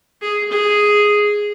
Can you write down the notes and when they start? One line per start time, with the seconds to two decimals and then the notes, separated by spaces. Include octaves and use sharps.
0.21 G#4
0.51 G#4